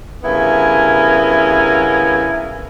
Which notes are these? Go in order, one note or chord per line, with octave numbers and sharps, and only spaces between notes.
G2 C#3 B3 E4 A#4 G#5